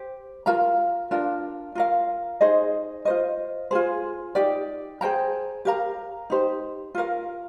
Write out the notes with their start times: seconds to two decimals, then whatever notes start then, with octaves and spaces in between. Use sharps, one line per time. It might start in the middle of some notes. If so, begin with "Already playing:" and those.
Already playing: G4 C5
0.46 F4 A#4 F5 A#5
1.11 D4 F4 A#4
1.75 F4 A#4 F5
2.41 D#4 G#4 C5 D#5
3.05 F4 C5 D#5
3.71 F4 G#4 C5
4.35 D#4 G4 D5 G5
5.01 G#4 C5 G5 A#5
5.65 G4 A#4 F5 A#5
6.30 D#4 G4 C5
6.95 F4 A#4 F5